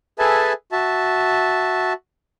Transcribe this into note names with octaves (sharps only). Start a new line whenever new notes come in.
G#4 A4 B4 E5 G#5 A5
F#4 E5 A5